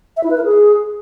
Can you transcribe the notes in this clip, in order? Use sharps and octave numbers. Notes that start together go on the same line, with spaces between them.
E5
E4
B4
A#4
G#4